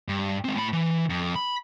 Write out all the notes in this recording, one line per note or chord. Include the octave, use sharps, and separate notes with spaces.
G2
G#3 C4
A2 B5
E3
F2
B5